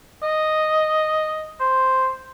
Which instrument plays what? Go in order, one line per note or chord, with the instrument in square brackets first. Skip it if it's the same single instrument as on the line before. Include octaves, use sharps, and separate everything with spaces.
[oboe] D#5
C5